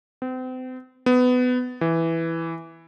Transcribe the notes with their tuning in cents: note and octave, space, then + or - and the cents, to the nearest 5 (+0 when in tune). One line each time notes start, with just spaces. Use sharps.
C4 -35
B3 +20
E3 +0